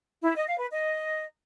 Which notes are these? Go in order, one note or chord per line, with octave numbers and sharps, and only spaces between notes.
E4
D#5
F5
B4
D#5